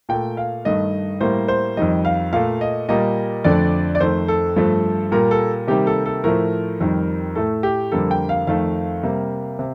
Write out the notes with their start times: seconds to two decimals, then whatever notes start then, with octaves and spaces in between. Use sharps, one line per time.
0.09 A#2 A3 G5
0.37 F5
0.65 G2 D#3 A3 D#5
1.20 A2 G3 A#3 C5
1.48 C5
1.77 F2 D#3 G3 D#5
2.05 F5
2.33 A#2 A3 F5
2.61 D#5
2.89 A#2 G3 A#3 D#5
3.44 F2 D3 A3 D5
3.95 D5
4.00 F2 D#3 A3 C5
4.28 A4
4.56 G2 F3 A3
5.12 A#2 G3 A#3 A#4
5.31 A4
5.68 C3 D#3 G3 A#3 G4
5.87 A4
6.06 A4
6.24 A2 F3 A3 A#4
6.80 F2 D#3 G3
7.35 A2 A3 A4
7.63 G4
7.92 F2 D3 G3 A#3 A4
8.11 G5
8.29 F5
8.47 F2 D#3 A3 F5
9.03 C3 G3 A#3
9.59 C3